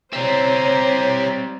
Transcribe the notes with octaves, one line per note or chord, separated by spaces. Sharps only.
G3 C4 G4 C5 C#5 E5 A#5